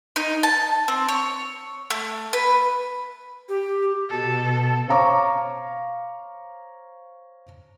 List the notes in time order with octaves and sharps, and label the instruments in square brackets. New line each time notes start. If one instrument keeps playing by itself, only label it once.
[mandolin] D#4
A5
C4
C#5
A3
B4
[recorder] G4
[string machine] B2 [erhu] A4
[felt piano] C5 C#5 F5 A#5 C#6 D6